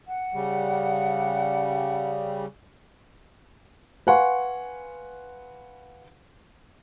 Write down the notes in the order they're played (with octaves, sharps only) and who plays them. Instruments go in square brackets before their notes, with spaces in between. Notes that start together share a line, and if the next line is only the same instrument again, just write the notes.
[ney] F#5
[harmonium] C#3 G3
[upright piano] B4 F5 F#5 G#5 C6 C#6